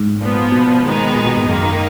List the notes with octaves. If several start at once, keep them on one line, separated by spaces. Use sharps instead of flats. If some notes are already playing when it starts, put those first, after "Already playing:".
Already playing: G#2
A#2 F3 B3
B2
D#3 G#3 B3 D#4
A#2
B2
G#2
F#2 D#3 A#3 D#4